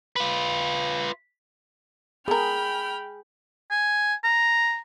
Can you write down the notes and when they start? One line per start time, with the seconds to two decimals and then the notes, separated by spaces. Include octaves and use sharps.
0.16 F4 B4
2.28 B3 G#4 A#4 G5 B5 F6
3.71 G#5
4.24 A#5